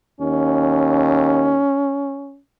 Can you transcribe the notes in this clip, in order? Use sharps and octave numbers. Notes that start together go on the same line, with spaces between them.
D#2 C#4